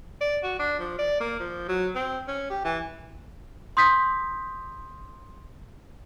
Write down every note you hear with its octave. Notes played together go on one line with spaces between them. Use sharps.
D5
F#4
D4
F3
D5
A#3
F3
F#3
C4
C#4
G4
E3
C6 D#6 G6 B6